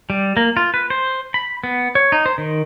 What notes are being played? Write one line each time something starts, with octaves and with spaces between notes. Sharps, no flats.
G3
A#3
F4
B4
C5
B5
B3
C#5
D#4
C5
D#3